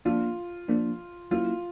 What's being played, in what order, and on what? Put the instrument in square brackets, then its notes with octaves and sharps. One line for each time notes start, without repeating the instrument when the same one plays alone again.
[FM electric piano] F3 A#3 D4 [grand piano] F4
[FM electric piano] F3 A#3 D4
[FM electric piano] F#3 A#3 C#4 E4 [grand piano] F4